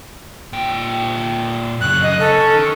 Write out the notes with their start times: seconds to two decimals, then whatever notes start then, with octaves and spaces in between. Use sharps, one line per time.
0.53 A#2 G5
1.81 F#2 C#3 F#6
2.02 D#5
2.20 C#4 A4
2.56 D#3